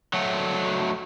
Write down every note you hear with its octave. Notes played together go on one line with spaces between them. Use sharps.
F#3 A3